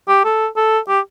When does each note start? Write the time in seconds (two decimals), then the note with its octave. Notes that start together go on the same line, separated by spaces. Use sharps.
0.08 G4
0.24 A4
0.56 A4
0.89 G4